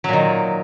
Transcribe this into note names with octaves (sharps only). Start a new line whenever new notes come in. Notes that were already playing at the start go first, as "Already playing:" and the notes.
A#2 D#3 F#3